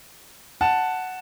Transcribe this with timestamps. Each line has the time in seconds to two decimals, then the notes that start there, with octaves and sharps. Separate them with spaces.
0.61 F#5 A5